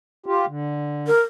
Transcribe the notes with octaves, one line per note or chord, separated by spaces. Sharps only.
F4 G4
D3
A#4